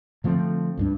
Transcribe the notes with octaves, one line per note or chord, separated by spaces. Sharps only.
D3 F3 A3 C4
C#2 G2 D4